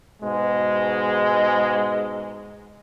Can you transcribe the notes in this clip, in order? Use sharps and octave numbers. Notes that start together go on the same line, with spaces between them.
G#2 B2 G#3